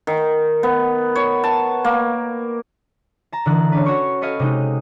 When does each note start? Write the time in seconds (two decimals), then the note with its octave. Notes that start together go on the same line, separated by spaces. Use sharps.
0.07 D#3
0.63 B3
1.15 C#5
1.44 A5
1.84 A#3
3.32 A5 A#5
3.46 D3 E3 F#6
3.72 C#4 D4 B4
3.86 F#4 C#5 C#6
4.21 A4 B4 C#5 D#5 F5
4.39 C3 G#3 D#4